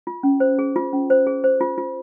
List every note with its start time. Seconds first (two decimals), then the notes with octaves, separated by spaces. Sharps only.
0.07 F4
0.23 C#4
0.40 C5
0.59 G#4
0.76 F4
0.93 C#4
1.10 C5
1.27 G#4
1.44 C5
1.61 F4
1.78 F4